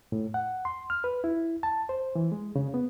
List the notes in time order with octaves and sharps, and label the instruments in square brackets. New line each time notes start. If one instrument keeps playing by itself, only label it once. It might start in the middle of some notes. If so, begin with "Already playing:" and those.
[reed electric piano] A2
F#5
C6
F6
B4
E4
A5
C5
E3
G#3
C#3
B3